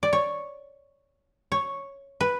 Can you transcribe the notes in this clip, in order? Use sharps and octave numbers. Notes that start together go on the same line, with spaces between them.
D5
C#5
C#5
B4